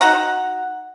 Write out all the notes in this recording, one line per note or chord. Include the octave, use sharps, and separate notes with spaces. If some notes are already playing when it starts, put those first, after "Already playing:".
D#4 F#4 F#5 A#5